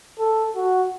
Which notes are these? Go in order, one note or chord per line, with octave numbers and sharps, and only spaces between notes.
A4
F#4